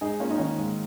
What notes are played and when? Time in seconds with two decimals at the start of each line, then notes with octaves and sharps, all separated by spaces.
0.01 G#2 D#4 G#4
0.20 A#3 C#4 F4
0.30 D#4
0.38 D#3 C#4
0.58 G#2